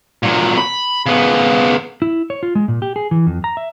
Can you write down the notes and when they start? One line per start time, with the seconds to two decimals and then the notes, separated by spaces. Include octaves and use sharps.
0.23 A#2 F#3
0.58 B5
1.06 C#3 B3
2.02 E4
2.30 C#5
2.43 F4
2.55 G#3
2.68 A#2
2.82 G4
2.96 G#4
3.11 E3
3.26 F2
3.44 A#5
3.57 E5